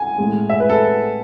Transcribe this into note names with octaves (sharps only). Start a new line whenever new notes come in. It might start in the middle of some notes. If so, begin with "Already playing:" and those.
Already playing: G#5
A2 G#3
E5
B4
A4